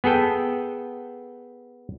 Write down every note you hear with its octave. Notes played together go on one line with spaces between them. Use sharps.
B3 G#4 A4 G5